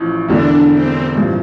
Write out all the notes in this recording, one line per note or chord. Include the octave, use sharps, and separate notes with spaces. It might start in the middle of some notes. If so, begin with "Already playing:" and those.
Already playing: A1 A2 F3
E1 E2 D3 D4
C4
A1 G2 F3